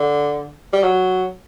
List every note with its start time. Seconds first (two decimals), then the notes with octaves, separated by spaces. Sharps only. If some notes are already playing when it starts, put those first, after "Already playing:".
Already playing: D3
0.73 G3
0.84 F#3